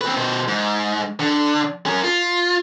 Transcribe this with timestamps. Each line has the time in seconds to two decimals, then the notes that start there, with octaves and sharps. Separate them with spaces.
0.01 C4 B4
0.16 B2 C5
0.48 G#2
1.19 D3
1.86 C#4 A#4
2.04 F4